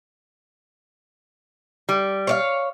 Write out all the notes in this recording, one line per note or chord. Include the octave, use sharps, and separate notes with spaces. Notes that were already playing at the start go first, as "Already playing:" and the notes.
G3
C#5 D5 F5